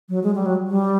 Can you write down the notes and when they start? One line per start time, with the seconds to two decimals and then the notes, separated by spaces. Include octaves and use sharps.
0.09 F#3
0.23 G#3
0.35 G3
0.46 F#3
0.68 G3